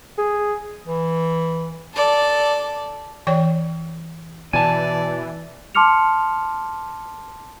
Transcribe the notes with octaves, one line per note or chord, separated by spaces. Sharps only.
G#4
E3
A4 D5
E3 C#5 D5 G5
B2 E3 D5 G#5 A5
A5 C6 D6 F6 C#7 F7